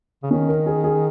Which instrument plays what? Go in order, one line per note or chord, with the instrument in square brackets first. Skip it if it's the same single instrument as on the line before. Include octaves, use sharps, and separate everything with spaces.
[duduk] C#3
[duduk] D#3 [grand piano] C#4
[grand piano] A#4
G#4
G#4